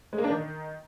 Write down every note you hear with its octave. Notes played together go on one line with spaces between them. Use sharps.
G#3
A#3
D4
D#3